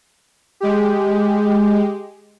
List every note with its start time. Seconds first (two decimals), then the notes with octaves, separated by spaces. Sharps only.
0.60 G#3 G4